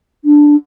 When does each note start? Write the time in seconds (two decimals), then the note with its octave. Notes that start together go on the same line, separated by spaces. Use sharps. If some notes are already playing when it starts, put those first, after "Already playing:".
0.24 D4